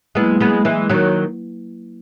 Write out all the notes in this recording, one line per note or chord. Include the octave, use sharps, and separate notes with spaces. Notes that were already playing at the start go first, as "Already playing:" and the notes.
F#3 G#3 A#3 B3 E4 B4
G#3 B3
E3 G#3
D#3 F#3